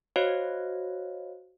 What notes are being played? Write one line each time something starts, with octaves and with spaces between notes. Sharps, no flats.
F#4 C5 C#5 D#5 F5